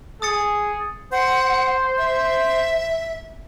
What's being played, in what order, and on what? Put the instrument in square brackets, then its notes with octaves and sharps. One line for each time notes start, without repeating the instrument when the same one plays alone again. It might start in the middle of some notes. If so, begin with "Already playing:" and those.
[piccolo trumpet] G#4 [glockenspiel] D#6 A6 C#7
[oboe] C5 [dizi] F#5
[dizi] E5